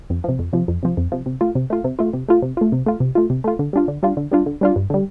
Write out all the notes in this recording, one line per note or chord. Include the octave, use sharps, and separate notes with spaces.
F2
C3 F3
F2
C3 F3
F2
C3 F3
F2
C3 F3
C3
A3 F4
C3
A3 F4
C3
A3 F4
C3
A3 F4
C3
A3 F4
C3
A3 F4
C3
A3 F4
C3
A3 F4
D3
G3 D4 F4
D3
G3 D4 F4
D3
G3 D4 F4
D3
G3 D4 F4
G2
D3 G3